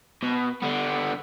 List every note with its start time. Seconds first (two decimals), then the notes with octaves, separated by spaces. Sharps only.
0.23 B2
0.62 D3 B3